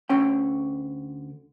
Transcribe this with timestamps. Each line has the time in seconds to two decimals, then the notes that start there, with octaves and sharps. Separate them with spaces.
0.09 D2 D3 C#4 G5